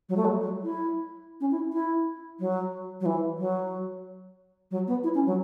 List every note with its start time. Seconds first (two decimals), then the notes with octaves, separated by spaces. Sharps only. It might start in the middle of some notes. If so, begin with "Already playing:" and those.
0.09 F#3
0.16 A3
0.24 F#3
0.40 F#3
0.63 E4
1.40 C#4
1.51 E4
1.73 E4
2.39 F#3
3.00 F#3
3.05 E3
3.38 F#3
4.71 F#3
4.87 B3
5.03 E4
5.14 C#4
5.26 F#3